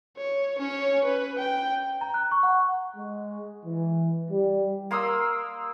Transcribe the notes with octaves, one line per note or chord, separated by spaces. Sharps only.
C#5
C#4 C#5
B4
G5
A#5
F#6
C#6
F#5
G#3
E3
G3
A#3 C6 D#6 E6